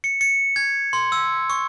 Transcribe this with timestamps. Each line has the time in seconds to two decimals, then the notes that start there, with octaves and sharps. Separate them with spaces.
0.04 C#7
0.21 C#7
0.56 G#6
0.93 C6
1.12 E6
1.50 C#6